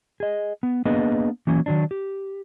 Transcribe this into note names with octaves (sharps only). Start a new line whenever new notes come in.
G#4 D#5
B3
A#3 B3 D4 G#4 B4 D#5
E3 F#3 A#3 C#4
D#3 F#3 D4
G4